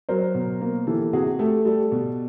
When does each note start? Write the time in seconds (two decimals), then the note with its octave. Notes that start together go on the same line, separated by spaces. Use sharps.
0.09 F#3 A#4 C5
0.35 B2
0.61 A#3
0.87 E3 G4 A4
1.13 C3 F#4 G#4
1.39 A3 G4 A4
1.65 G3 G4 A4
1.92 B2